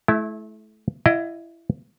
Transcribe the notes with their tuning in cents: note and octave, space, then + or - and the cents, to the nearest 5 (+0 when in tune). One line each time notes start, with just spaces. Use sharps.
A3 -30 E4 +0
E4 +20 D#5 +0 F#5 -45